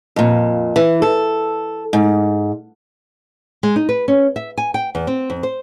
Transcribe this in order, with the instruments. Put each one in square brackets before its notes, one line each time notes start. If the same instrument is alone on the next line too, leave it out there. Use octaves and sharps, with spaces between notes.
[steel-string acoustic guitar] F2 A#2
E3
A4
G#2
[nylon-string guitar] G#3
D#4
B4
C#4
E5
G#5
G5
E2
C4
F2
C5